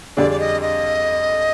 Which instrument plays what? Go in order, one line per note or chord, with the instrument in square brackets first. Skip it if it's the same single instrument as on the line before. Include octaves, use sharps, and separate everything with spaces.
[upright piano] F2 D3 G3 D4 G#4 [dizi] D5
[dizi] D5
D#5
D#5